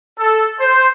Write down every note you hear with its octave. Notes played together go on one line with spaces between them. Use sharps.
A4
C5